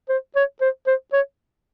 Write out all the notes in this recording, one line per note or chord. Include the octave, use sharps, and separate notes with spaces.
C5
C#5
C5
C5
C#5